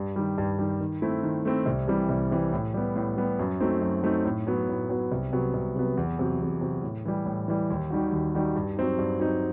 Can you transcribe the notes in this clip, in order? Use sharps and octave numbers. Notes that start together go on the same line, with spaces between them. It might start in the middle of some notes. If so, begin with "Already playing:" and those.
Already playing: G2
D#3 G3
G2
D#3 G3
D#3
A3 C4 E4
D#3
A3 C4 E4
C2
C3 E3 G3
C2
C3 E3 G3
A2
G3 B3
A2
G3 B3
F#2
F#3 A3 C4 D#4
F#2
F#3 A3 C4 D#4
A2
F#3 B3
A2
F#3 B3
C2
C3 F#3 B3
C2
C3 F#3 B3
E2
C3 F#3
E2
C3 F#3
A2
E3 G3
A2
E3 G3
D#2
D#3 G3 D#4 F#4
D#2
D#3 G3 D#4 F#4
G2
F#3 C4 D#4
G2
F#3 C4 D#4